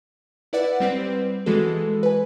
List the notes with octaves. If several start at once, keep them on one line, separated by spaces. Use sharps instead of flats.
E4 B4 D5 F#5
G3 C4 B4
E3 G#3 F#4 A4
B4 G#5